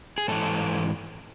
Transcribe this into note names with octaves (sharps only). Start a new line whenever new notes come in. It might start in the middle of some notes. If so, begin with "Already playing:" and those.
G#4
G#2 E3 A4